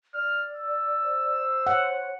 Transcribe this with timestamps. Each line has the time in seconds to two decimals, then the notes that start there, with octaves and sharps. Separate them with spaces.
0.14 D5 F6
0.56 E6
1.05 C5
1.67 C#5 F#5